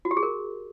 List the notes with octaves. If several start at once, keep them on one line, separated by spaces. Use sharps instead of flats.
F#4
G4
G#4
A#4